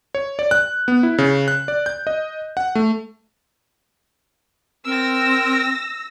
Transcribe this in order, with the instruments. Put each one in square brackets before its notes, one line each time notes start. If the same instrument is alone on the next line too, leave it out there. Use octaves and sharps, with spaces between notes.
[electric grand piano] C#5
D5
F#6
B3
E4
C#3
F#6
D5
G6
D#5
F#5
A3
[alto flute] C4 [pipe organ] A#4 [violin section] E6 A#6